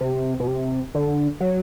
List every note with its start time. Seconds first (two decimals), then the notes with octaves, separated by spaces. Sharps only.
0.01 C3
0.40 B2
0.47 C3
0.95 D3
1.41 F#3